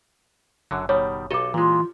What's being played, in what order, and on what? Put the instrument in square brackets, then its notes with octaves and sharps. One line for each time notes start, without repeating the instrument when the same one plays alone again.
[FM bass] F#1 [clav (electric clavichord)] F#2 D3 F#3
[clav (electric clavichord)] B2 D#3 G3 [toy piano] C#5
[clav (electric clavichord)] B1 A4 D#5 [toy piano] G4 D6
[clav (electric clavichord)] A#2 G#3 [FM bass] E3 [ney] F4